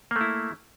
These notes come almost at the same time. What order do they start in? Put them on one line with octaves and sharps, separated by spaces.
A#3 A3 E4